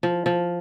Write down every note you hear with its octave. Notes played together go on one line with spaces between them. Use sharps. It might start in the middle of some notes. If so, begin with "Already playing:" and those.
F3
F3